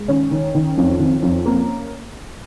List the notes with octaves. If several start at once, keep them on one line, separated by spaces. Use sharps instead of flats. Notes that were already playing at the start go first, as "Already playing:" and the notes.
Already playing: G#3
D#3 C#4
D#3
D#3
F2
D#3
F2
A#3